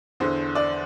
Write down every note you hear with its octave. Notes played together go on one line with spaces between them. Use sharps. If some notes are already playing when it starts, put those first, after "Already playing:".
E2 D3 C5
D5